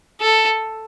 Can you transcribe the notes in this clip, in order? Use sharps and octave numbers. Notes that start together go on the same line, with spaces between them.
A4